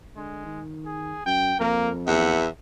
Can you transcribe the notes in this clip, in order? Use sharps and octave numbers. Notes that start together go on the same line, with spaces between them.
D3 G#3
D#3
G#4
F#2 G5
F2 A#3 A#4
E2 E5 F#5